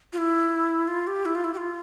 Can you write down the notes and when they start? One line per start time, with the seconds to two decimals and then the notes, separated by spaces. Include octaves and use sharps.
0.13 F4
0.18 E4
0.88 F4
1.07 G4
1.26 E4
1.35 F4
1.44 E4
1.54 G4
1.57 F4